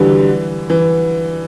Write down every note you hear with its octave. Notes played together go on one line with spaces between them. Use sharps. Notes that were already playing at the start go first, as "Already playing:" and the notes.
Already playing: D3 E3 F#3 G3
E3